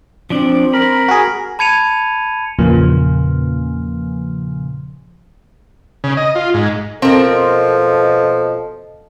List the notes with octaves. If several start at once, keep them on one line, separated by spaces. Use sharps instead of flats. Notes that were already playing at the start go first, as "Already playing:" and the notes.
F3 C4 D4 D5
A#4 B5
F#4 G#4
A5 B5 G#6 C#7 D#7 F7
E2 A#2 C#3 F3 A#3
C#3
D#5
F4
G#2
B2 F3 C4 A4 A#4 D#5